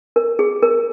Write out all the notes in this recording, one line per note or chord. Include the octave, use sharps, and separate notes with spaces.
A#4
G#4
A#4